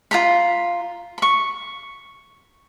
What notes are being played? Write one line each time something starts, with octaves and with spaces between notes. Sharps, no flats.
F4 A#5 B5
B5 C#6